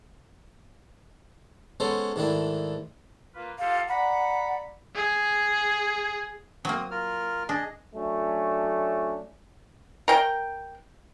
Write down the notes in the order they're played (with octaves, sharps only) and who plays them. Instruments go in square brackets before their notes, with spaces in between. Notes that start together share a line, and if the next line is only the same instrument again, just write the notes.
[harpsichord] G#3 B3 C#4 A4 C5
G#2 D#3 A3 D4 E4
[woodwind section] A#3 F4 B4
[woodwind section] F4 G4 A4 [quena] F5
[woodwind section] D5 A#5 B5 [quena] F#5
[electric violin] G#4
[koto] F#3 A#3 [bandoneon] C4 D#6
[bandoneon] F4 A#4 F6
[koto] D4 [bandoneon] G#4 D#5
[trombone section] F#3 A3 C#4 D4
[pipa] A#4 G5